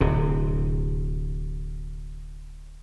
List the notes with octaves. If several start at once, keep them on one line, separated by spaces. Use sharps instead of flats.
D1 C3